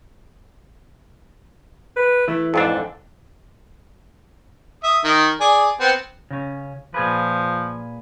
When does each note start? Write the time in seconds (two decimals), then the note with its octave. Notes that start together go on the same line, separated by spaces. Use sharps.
1.97 B4
2.28 E3 A3
2.54 F2 G#2 D4 A4
4.84 E5 D#6
5.04 D#3
5.40 G#4 D5 G#5
5.80 B3 C4
6.30 C#3 C#4
6.94 A#2 F3 G#4 B4